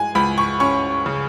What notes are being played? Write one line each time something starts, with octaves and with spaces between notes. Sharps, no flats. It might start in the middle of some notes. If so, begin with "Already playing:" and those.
Already playing: G#3 G#5
C#2 B5
C#6
C#4 C#6
C#3